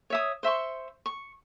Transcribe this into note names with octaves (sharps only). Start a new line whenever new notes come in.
C#5 E5 D#6
C5 E5 C6 C#6
C#6